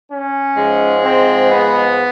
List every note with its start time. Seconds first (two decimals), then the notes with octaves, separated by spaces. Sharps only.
0.09 C#4
0.56 G#2 F3 G#3
1.02 C4
1.49 B3